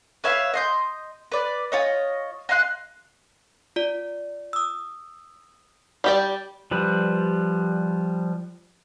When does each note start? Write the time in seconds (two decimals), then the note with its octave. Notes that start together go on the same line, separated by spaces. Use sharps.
0.24 B4 C#5 E5 F5
0.54 D#5 C6 G6
1.32 B4 D5
1.72 F4 C#5 D#5
2.49 D#5 F5 C6 F#6
3.76 F4 D5
4.53 D#6 E6
6.04 G3 G4 D5
6.71 F3 G3 B4